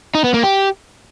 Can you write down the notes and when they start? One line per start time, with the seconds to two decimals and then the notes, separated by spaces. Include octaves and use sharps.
0.15 D#4
0.24 B3
0.34 A#3
0.44 G4